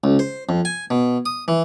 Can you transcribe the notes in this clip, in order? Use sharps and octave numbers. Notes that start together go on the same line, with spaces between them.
C#2
C5
F2
G#5
B2
D#6
E3